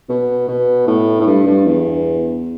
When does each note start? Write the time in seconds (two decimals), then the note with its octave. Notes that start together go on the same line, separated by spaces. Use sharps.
0.09 B2
0.48 B2
0.87 A2
1.21 A2
1.27 G2
1.47 G2
1.67 E2